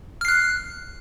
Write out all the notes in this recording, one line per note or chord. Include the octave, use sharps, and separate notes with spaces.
F6 F#6 C7